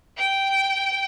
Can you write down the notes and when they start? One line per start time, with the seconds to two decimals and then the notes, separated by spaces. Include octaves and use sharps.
0.17 G5